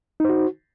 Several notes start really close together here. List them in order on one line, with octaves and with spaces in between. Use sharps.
D#4 C5 F#4